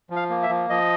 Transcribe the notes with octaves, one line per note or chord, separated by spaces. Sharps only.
F3
F5
A#3
E5
F3
F3 D#5